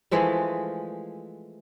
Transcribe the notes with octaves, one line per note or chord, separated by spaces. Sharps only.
E3 F3 G#3 A3